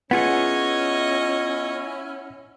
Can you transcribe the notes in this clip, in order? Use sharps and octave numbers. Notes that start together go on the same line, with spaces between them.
B3 C#4 E4 F4 G#4 C#5 D#5 F#5